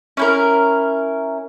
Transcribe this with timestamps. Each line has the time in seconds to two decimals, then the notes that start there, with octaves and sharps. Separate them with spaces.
0.17 C#4 E4 A#4